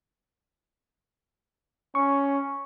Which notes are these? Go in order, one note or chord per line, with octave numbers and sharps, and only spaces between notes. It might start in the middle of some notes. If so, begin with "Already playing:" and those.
C#4 C#6